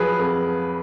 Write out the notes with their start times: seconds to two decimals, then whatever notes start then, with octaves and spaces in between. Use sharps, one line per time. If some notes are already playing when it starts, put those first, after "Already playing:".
Already playing: F3 F#3 G#4 B4
0.19 F2